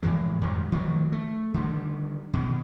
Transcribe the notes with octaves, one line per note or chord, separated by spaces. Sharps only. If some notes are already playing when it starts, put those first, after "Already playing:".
A2 E3 F3 G#3
F2 G#2 D#3 G3
D#3 F3 F#3 A3
A3
D3 D#3 G3
B2 D#3